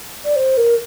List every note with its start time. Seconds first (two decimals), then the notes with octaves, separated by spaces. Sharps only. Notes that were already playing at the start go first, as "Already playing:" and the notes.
0.25 D5
0.36 C5
0.57 A#4